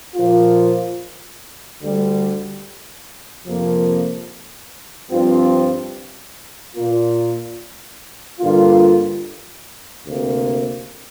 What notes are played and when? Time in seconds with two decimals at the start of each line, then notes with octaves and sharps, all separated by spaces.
0.16 A#2 F3 A#3 F4
1.81 D2 D3 G3
3.46 F2 C3 F3 A#3
5.11 G2 F3 C4 F4
6.76 A#2 A#3 F4
8.41 G2 D3 A#3 F4
10.06 D2 C3 A#3